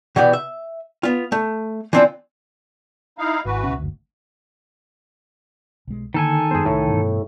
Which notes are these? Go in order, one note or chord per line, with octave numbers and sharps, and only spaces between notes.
B2 E3 B3 G4 D5
E5
B3 F4
A3
E3 F3 C4 D4 F4
D#4 E4 F5
G#1 E3 F#4 B4
C#2 B2 C#4
F#1 D2
B1 G#3
D3 D#3 A#3 A4 G#5
F#2 G#3 B3 G#4 C5
C2 A2
G2 B2 E3